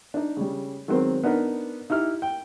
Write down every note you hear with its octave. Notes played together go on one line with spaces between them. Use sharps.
D4 D#4
C#3 G3
D#3 F#3 G#3 B3 C4
B3 D4 D#4 A#4 B4
D#4 E4 G4 F6
G5